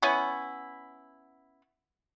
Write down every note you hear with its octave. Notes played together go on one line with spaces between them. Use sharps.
B3 C#4 E4